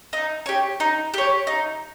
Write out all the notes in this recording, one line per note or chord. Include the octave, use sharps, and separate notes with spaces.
D#4
G4 C#5
D#4
G4 C#5
D#4